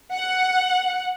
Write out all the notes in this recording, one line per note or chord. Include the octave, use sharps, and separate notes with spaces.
F#5